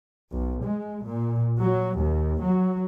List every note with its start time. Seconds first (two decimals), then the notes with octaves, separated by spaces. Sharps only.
0.32 B1
0.63 G#3
1.05 A#2
1.60 F#3
1.97 D#2
2.42 F#3